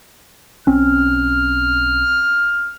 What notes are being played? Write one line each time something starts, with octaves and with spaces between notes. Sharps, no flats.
B1 C4 C#4 F6